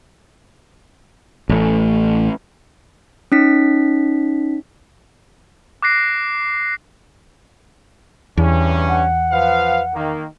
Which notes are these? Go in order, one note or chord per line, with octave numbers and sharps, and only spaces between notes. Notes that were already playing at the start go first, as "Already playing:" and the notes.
A1 A3
C#4 D#4 B6
D6 F#6 A#6 C7 D7
E2 G2 E3 C#4
F#5
F3 B4 F5
D#3 A#3